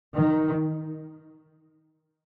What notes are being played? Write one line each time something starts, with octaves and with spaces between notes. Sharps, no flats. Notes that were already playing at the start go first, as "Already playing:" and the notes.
D#3